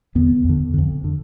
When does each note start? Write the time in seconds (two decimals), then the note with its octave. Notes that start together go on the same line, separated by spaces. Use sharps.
0.15 E2 D3 B3
0.44 F2 D3
0.74 F2 D3
1.04 D3